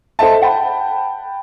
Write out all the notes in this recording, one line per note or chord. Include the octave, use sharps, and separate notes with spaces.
A4 C5 D#5 E5 A5
F#5 G5 A5 B5